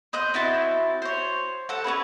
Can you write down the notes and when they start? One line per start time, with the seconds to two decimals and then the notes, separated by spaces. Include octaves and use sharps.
0.13 C5 D#5 F#6 G6
0.34 C4 E4 F#4 A5
1.02 C5 C#5
1.69 A4 F#5
1.84 C#4 D#4 G#4 B4